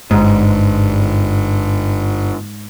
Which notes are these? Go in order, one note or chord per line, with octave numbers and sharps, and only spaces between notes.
G1 G#2